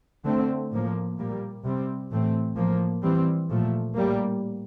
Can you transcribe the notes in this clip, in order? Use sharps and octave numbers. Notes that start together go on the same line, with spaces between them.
D3 A3 C4
A2 F3 A#3
A#2 G3 A#3
C3 G3 C4
A2 E3 A3 C4
A2 F3 A#3
E3 G3 C4
A#2 F3 A3
A2 G3 A#3